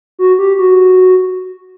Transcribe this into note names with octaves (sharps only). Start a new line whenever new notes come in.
F#4
G4
F#4